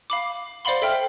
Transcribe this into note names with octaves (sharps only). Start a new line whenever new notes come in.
F5 B5 D6
C5 D5 F5 F#5 B5 C6
A4 E5 G5 F6